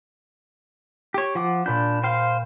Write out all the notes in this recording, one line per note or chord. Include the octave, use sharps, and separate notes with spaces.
G4 C#5
F3 F#5 D6
A#2 D4 B5 G6
C5 F5 G5